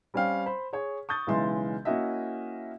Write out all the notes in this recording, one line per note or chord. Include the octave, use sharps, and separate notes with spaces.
G3 C4 C#4 D5 F5 G5
C5 B5
G#4 C#5
C#6 D#6 G6 A6
B1 C#3 E3 G#3 E5 C6
A#3 C#4 E4 F#4 D#5 E5